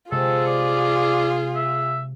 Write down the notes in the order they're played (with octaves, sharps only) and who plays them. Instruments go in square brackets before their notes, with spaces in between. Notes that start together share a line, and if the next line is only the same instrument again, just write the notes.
[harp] C3 G#3 [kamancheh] F4 G#4 [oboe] A4
[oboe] D5
E5